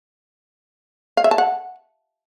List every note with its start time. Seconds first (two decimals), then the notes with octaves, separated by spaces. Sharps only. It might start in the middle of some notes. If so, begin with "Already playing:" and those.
1.17 F5
1.24 E5
1.31 A5
1.38 F#5